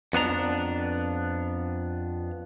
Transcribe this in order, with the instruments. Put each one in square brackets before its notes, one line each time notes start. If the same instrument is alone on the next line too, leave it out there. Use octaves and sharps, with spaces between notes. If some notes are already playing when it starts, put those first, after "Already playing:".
[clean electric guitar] F2 B3 D4 A#5